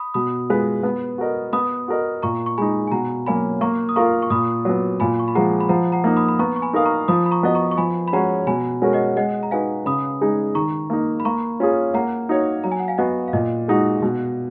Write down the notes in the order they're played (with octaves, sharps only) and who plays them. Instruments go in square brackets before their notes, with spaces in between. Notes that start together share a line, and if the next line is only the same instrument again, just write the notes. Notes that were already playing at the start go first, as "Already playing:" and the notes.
Already playing: [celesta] B5 D#6
[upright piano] B2 [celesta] B5 D#6
[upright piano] G#3 B3 F4 B4
B3
F#4 A#4 D#5
[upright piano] B3 [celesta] B5 D#6
[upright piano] F#4 A#4 D#5
[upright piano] A#2 [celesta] A#5 C#6
[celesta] C#6
[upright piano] G#3 D#4 [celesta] G#5 B5
[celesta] G#5
[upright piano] B2 [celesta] F#5 A#5
[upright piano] F#3 A#3 C#4 [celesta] G#5 B5
[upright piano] A#3 [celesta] A#5 C#6
[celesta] D#6
[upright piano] F4 A#4 F5 [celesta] A#5 C#6
[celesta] C#6
[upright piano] A#2 [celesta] B5 D#6
[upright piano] F#3 B3
[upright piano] A#2 [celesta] G#5 B5
[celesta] C#6
B5
[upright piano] F3 G#3 [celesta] F#5 A#5
[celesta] B5
[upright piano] F3 [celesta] F#5 A#5
[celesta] F#5 A#5
[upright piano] A#3 D#4
[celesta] B5 D#6
B5
[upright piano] B3 [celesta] A#5 C#6
[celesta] C#6
G#5 B5
[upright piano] D#4 A#4 F5 [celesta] D#6
[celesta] A#5 C#6
[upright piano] F3 [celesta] B5 D#6
[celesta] B5
A#5 C#6
[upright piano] B3 F#4 B4 D#5
[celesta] A#5 C#6
C#6
[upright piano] F3 [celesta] G#5 B5
[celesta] B5
[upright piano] G#3 C#4 F#4 C#5 [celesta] F#5 A#5
[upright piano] B2 [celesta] G#5 B5
[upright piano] G#3 C#4 F#4 A#4
[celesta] D#5 F#5
[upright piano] G#3 [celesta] D#5 F#5
[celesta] A#5
[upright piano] D#4 F#4 B4 [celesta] F5 G#5
[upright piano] C#3 [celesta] B5 D#6
[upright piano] G#3 D#4 G#4
[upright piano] D#3 [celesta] A#5 C#6
[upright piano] A#3 D#4
[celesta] B5
[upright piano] A#3 [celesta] A#5 C#6
[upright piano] C#4 F4 G#4
[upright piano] A#3 [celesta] F#5 A#5
[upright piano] D#4 F#4 C#5
[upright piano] F#3 [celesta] A#5
[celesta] G#5
F#5
F5 G#5
[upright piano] B3 F#4 [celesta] D#5 F#5
[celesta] F5
[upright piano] A#2 [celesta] D#5
[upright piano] G#3 D#4 F#4
B2